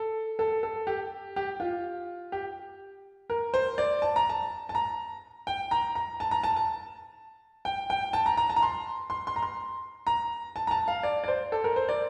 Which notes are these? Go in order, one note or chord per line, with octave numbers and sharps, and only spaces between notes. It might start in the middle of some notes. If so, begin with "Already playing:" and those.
Already playing: A4
A4
A4
G4
G4
F4
G4
A#4
C5
D5
A5
A#5
A5
A5
A#5
G5
A#5
A#5
A5
A#5
A5
A5
G5
G5
A5
A#5
A#5
A5
A#5
C6
C6
C6
A#5
C6
A#5
A5
A#5
A5
F5
D5
D5
C5
A4
A#4
C5
D5